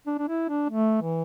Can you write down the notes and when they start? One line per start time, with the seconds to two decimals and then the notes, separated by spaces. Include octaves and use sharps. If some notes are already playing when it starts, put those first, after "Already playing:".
0.07 D4
0.18 D4
0.28 E4
0.49 D4
0.69 A3
1.02 E3